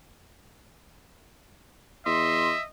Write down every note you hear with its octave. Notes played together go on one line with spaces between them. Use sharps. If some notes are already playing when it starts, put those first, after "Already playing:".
E2 D#5 E5 C6